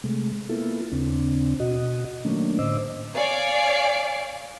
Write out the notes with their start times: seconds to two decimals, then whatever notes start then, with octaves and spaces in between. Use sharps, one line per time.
0.04 C3 G#3 A3
0.49 A#3 B3 E4 F4 A4
0.92 D#2 C#3 C4 D4
1.60 B2 F#4 D#5
2.25 D#3 F#3 A3 A#3 C#4 D4
2.59 A2 D3 C5 D#5 D6 E6
3.15 C#5 D5 F5 G#5 C7 D7